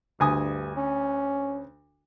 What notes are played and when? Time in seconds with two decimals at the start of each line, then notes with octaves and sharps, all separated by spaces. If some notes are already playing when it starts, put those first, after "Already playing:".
0.20 D2 G2 G#5 D#6
0.76 C#4